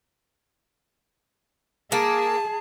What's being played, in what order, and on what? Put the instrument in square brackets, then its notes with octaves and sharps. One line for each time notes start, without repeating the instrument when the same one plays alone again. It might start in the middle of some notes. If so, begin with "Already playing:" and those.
[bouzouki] A#3 [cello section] G#4 [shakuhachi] A5